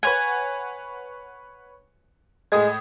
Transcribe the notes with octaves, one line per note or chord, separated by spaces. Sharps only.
B4 C#5 F#5 G#5
A2 G#3 D#6 G#6